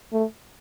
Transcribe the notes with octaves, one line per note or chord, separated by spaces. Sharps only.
A3